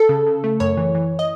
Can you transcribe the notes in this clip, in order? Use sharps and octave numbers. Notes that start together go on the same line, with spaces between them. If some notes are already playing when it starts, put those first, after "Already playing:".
Already playing: A4
C#3
C#3
A3
F#2 C#5
E3
E3
D#5